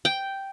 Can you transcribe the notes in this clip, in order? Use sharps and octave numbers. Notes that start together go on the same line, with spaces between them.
G5